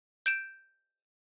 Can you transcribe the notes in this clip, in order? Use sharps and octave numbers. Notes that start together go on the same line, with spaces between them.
G6 D7 E7